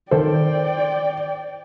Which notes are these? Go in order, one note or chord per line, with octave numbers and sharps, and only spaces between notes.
D#3 A4 C5 D5 G5